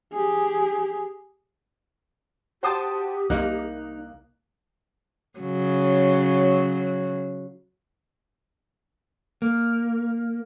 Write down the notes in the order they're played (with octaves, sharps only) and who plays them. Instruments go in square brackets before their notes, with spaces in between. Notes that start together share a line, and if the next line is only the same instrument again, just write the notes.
[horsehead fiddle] G4 G#4
[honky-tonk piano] F#4 G5 D#6 [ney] G4 [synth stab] C5 A5
[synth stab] C2 A#3 [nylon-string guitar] D#4 [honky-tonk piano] F#6
[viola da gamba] C#3 F#3
[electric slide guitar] A#3